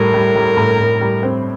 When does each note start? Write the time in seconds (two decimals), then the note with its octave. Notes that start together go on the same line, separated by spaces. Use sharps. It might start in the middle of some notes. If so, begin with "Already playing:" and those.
Already playing: A2 G3 A#4
0.14 G3
0.35 G3
0.57 A2
0.80 A2
1.01 G3
1.23 C4